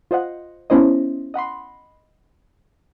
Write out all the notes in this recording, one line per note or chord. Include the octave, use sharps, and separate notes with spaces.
F4 C5 D#5 F#5
B3 C#4 E4 C5 D#5
D#5 F#5 B5 C6